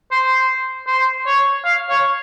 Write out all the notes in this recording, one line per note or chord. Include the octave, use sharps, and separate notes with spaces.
C5
C5
C#5
F5
C#5